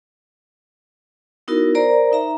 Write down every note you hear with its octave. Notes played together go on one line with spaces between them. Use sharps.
B3 D#4 E4 F#4 A#4
A#4 C5 D5 A#5
D#4 E5 A#5